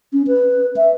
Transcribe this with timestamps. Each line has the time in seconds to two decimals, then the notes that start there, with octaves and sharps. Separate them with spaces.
0.13 C#4
0.27 B4
0.76 E5